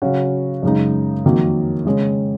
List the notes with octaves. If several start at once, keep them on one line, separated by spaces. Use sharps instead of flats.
C#3 F#3 C#4 F#4
F#2 C#3 G#3 D#4
F2 D#3 F#3 A#3
C#3 G#3 C#4